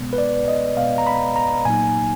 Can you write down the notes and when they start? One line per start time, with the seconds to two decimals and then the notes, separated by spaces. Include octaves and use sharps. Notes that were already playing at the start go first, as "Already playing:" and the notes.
Already playing: B2 G#3 B3
0.13 B4
0.18 D5
0.48 D#5
0.77 B2 G#3 B3 F5
0.98 A#5
1.07 B5
1.36 A#5
1.65 A#2 F#3 A#3 D#4 G#5